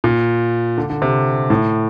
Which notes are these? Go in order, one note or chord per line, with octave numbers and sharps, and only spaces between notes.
A#2
D3
D3
C3
A2